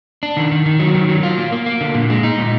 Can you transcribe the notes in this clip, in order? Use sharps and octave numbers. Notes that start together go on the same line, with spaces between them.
D4
D#3
D#3
D#3
F#3
D#3
F#3
F4
A#3
A#3
A#3
D3
A#2
G#3
D#4
A#2